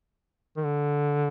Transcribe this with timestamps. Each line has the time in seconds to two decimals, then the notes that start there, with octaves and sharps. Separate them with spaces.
0.56 D#3
0.64 D3